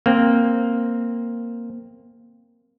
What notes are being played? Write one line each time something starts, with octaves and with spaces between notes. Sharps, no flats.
A#3 C4